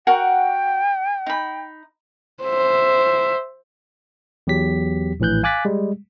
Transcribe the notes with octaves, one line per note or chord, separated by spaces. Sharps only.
F#4 A#4 F#5 G5
D#4 B5
C5 E5
E2 F#3 G4 B6
A#1 A2 E3 F#6 G6
F5 G#5 D6 F#6 A6 B6
G3 G#3